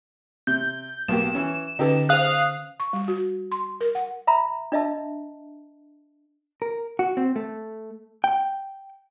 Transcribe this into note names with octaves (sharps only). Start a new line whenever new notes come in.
C3 G6
B1 A#3 G4 E7
E3 C#4
D3 C#4 D#4 G4 A4 B4
G#4 C5 F5 D#6 F#6
C#6
G3
F#4
C6
A#4
F#5
E5 A#5 B5
D4 D#5 E5 A5
A#4
F#4
C4
A3
G5